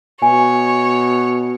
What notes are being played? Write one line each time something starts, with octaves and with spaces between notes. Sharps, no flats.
B2 C#5 G#5